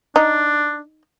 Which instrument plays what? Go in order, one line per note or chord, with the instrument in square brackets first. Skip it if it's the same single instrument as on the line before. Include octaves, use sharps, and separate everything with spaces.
[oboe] D4 [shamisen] D#4